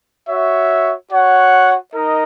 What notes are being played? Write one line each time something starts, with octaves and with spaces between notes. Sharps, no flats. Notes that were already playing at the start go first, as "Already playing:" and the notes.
F#4 C#5 E5
F#4 C#5 F#5
D#4 A#4 D#5